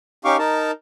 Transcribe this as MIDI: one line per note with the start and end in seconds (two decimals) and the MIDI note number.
0.25 0.37 61
0.25 0.37 63
0.25 0.37 67
0.25 0.37 77
0.25 0.37 85
0.25 0.37 86
0.39 0.71 63
0.39 0.71 70
0.39 0.71 81